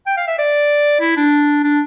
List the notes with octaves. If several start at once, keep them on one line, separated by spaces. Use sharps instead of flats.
G5
F5
E5
D5
E4
D4
D4